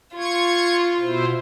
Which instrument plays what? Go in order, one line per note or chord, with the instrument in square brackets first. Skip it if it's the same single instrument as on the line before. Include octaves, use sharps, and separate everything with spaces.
[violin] F4 [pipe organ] C#6 G#6
[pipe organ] B2 E4 C5